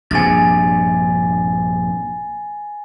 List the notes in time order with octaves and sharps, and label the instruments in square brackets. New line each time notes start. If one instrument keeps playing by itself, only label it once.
[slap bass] A#1 G2 C3 [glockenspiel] G#5 A6